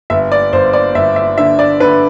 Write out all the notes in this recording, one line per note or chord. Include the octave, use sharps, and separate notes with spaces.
G1 E5
D5
G1 C5
D5
G1 E5
E5
D3 E5
D5
D3 B4